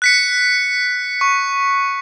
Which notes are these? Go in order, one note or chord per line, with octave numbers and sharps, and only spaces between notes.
F#6 B6 C#7
C#6